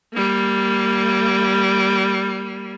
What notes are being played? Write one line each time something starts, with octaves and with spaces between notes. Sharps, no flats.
G3 A#3